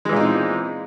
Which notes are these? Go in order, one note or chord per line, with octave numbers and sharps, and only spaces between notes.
A#2 E3 G#3 C4 D#4